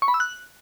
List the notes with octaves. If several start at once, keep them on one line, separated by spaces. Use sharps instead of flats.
C#6
B5
E6
F#6